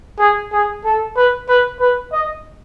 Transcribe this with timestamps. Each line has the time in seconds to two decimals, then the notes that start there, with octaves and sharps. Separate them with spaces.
0.19 G#4
0.52 G#4
0.85 A4
1.16 B4
1.49 B4
1.80 B4
2.12 D#5